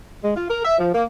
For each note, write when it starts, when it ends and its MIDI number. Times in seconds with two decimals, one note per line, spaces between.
0.24 0.33 56
0.36 0.45 65
0.49 0.60 70
0.64 0.79 76
0.79 0.89 53
0.94 1.03 58